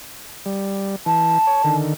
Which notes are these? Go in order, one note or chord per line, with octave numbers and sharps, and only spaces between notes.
G3
E3 A5
C#5
D3 D#3